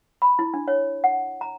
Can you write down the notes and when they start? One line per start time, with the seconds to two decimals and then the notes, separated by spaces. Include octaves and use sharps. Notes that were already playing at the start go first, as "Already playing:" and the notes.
0.22 B5
0.39 E4
0.54 D4
0.68 C#5
1.04 F#5
1.41 A#5